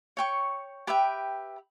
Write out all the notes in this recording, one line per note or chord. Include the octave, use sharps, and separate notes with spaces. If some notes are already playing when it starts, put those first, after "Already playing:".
C#5 G5 C#6
G4 B4 E5 G5